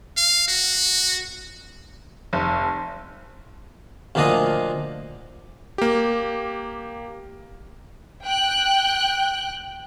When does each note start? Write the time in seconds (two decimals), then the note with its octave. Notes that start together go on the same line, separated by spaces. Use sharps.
0.17 F5
0.48 F#4
2.33 F1
4.15 D2 A#2 F3 D4 F4 D#5
5.78 A#3 G4
8.23 G5 F#6